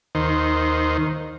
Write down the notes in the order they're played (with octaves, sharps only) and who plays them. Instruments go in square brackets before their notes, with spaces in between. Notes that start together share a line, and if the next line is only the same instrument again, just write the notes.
[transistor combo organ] D#2 D#3 C5